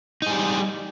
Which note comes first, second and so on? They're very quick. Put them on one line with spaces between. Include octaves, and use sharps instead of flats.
D#4 G#4 G3